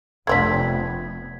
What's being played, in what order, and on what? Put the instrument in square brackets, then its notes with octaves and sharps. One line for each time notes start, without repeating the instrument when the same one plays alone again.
[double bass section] F1 B3 [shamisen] A3 C4 D4 [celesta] G#6 B6